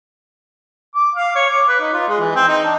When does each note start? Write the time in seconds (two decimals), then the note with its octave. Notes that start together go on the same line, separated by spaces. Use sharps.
0.95 D6
1.15 F5
1.36 C#5
1.50 D6
1.68 B4
1.81 D#4
1.93 F4
2.08 G#3
2.20 E3
2.35 C4
2.48 D#4
2.64 D4